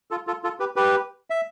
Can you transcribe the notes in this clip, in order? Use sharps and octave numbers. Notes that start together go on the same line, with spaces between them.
F4 A4
F4 A4
F4 A4
G4 B4
G4 B4
E5